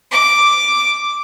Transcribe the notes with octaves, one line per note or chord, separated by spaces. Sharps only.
D6